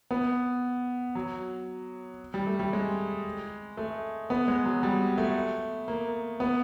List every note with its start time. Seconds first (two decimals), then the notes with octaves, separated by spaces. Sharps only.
0.11 B3
1.15 F#3
2.34 G3
2.46 A3
2.59 G3
2.73 G#3
3.77 A3
4.30 B3
4.48 G#3
4.65 F#3
4.83 G3
5.18 A3
5.88 A#3
6.40 B3